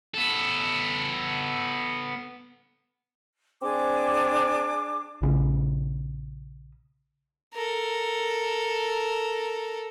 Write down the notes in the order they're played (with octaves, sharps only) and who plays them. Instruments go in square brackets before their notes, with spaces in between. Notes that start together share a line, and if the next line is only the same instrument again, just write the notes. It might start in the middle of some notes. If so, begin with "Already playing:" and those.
[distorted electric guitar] B3 A4
[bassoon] C4 [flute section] D4 G#4 D6
[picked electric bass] A#1 C#3
[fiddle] A4 A#4